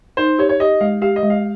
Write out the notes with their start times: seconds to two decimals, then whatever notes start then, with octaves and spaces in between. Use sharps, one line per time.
0.17 D#4 C5
0.38 G4 C#5
0.49 C#5
0.60 G4 D#5
0.81 G#3 F5
1.02 G4 F5
1.16 D#5
1.23 G#3
1.30 F5